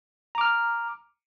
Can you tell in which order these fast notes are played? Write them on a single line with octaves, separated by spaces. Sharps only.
A#5 D6 F6